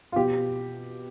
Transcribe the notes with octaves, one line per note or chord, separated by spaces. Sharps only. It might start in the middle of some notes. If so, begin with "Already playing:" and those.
F4
B2 G4